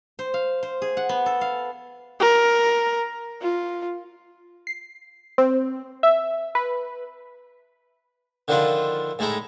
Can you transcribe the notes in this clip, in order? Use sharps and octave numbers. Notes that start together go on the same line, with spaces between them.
C5
F5
C5
G#4
F#5
B3
A4
F5
A#4
F4
C7
C4
E5
B4
D3 D#3 F3 D4 E4 F4
A2 G#3 D#4 E4 A#5